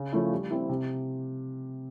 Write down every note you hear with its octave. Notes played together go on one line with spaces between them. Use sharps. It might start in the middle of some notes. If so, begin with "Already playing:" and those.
Already playing: C#3
F3 A3 C#4 E4
G3
C4 E4
C3